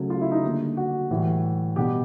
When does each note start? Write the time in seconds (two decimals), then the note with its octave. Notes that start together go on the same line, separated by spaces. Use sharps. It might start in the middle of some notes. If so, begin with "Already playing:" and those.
Already playing: C#3 F#3 A3
0.10 F4
0.21 E4
0.31 D#4
0.43 D3 G3 A#3
0.77 F#4
1.10 A2 E3 G3
1.76 B2 G3 B3 G4